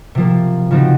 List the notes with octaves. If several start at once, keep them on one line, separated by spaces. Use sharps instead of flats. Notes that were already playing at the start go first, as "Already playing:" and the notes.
C3 F3 A#3
C#3 F3 C4 D#4 F#4